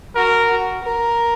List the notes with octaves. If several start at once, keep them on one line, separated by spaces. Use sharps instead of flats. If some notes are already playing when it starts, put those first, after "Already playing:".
F#4 A#4
F#4
A#4